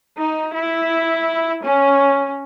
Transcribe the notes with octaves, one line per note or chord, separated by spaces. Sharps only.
D#4
E4
C#4